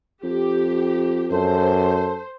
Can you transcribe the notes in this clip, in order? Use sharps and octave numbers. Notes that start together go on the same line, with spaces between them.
F2 G4
F#2 A4 C5